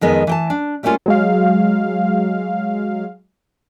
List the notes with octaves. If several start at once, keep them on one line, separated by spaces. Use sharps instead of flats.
F2 D#3 G#3 B3
E3 G5 A5
D4
G3 A3 A#3 C#4 F4
F#3 G#3 F5